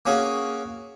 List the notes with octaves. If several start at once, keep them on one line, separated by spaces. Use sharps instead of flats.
A#3 C#4 F#4 G#4